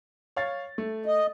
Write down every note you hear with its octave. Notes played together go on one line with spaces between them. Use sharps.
C#5 F5 A6
A3
D#5